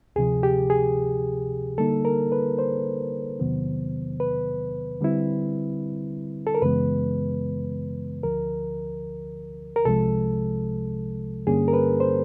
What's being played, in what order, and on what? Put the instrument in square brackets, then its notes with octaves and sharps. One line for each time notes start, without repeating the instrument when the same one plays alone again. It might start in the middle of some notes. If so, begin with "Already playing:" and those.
[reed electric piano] D2 C3 F3 G#4
G4
G#4
D3 G3 A#3 D#4 A4
A#4
B4
C5
E2 C3 D#3 F#3 B3
B4
D3 G3 C4 E4
A4
A#4
F#2 C#3 E3 G#3 B3 B4
D2 D3 F3 A#4
A#4
C2 C3 F3 G#3 A4
G2 D3 G3 A#3 C#4 G#4
A#4
B4
C5